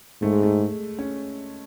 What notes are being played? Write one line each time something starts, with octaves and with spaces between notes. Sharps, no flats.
G#2 A3
G#3
A3
C#4